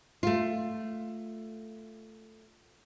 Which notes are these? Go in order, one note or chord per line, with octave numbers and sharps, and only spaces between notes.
A3 F4